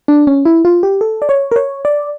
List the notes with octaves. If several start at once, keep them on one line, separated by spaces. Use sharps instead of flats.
D4
C#4
E4
F4
G4
A4
D5
C#5
A#4
C#5
D5